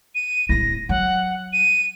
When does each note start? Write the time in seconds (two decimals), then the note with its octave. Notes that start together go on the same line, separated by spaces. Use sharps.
0.15 D#7
0.49 D1 E4 A#6
0.89 F#3 F#5
1.53 D#7